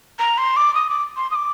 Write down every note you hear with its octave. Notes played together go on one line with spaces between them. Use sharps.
A#5
C6
D6
D#6
D6
C6
D#6
D6